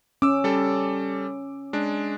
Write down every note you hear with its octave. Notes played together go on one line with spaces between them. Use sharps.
C#4 D6 E6
G3 A4
G#3 D4